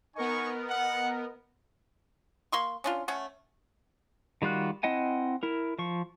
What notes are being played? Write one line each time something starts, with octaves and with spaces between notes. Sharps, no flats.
B3 D#4 A#4 D#5 G#5 C#6
F#5
A#3 C6 C#6
C#4 D4 F4
A3 C#4 F#5
D#3 G3 F4 F#4 F#6
C4 E4 D#5 F#5 G#5
E4 A#4
F3 C#6